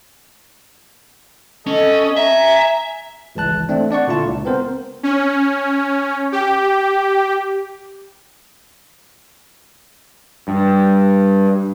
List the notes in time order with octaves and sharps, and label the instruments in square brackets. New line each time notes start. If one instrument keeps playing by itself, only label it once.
[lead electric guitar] C#4 [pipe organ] A4 D#5
[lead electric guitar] E5 [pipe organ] G#5 A#5
[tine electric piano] G#1 C#2 E3 A5 F#6
A3 C4 D4
D4 D5 F#5 C#6
A#2 D3 E4 F4 A5
C#2
B3 C4 A#4 C5
[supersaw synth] C#4
G4
[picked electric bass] G2